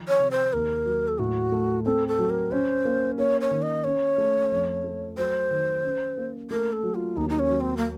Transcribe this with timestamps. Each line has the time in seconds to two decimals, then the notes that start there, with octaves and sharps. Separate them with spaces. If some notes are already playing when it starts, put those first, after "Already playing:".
Already playing: D#3 F3
0.08 C#5
0.19 C3
0.31 C5
0.53 D#2 A#4
0.86 F#3
1.08 A4
1.19 A2 F#4
1.52 A3
1.85 C4 A4
2.08 A4
2.19 F#3
2.30 A#4
2.51 C#4 C5
2.85 A#3
3.18 A#3 C#5
3.41 C#5
3.51 D#3
3.62 D#5
3.84 C#4 C#5
4.18 A3
4.51 F2
4.84 A3
5.18 F#3 C5
5.51 D#3
5.83 C#4
6.17 A#3
6.51 A3 A#4
6.72 A4
6.83 F#3
6.95 F4
7.16 D#2 D#4
7.30 D#4
7.39 C#4
7.49 F#3
7.60 C4
7.77 A#3